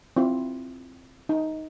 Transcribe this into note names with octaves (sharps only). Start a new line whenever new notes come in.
C4 E4 F4
D#4